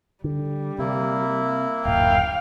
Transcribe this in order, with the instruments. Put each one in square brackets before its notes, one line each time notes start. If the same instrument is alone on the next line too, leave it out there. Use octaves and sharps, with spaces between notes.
[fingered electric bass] D3 [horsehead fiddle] G3
[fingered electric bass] C3 [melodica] A#3 E4
[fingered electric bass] D1 F#2 A#2 [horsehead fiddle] F5 G5